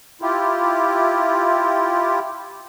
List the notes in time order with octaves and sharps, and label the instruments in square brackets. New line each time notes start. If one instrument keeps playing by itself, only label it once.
[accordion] E4 F4 G4